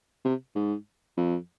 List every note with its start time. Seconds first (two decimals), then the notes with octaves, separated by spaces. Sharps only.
0.25 C3
0.55 G#2
1.17 F2